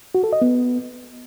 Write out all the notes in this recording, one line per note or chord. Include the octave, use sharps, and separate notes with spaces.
F#4
A4
D#5
B3